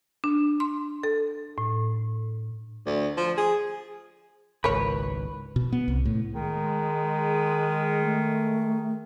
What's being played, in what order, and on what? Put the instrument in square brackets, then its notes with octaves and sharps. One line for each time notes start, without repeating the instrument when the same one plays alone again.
[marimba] D4
C6
A4
A2
[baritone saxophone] D2
F3
G#4
[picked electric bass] G#1 C#2 [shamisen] A#4 C#5 [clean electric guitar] B4
[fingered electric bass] B2
B3
C2
A2
[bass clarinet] D#3 [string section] G#3
[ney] A3